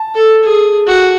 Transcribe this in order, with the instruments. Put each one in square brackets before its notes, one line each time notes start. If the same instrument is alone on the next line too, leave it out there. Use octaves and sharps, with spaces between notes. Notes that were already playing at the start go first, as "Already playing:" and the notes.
Already playing: [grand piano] A5
[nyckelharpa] A4
G#4
F#4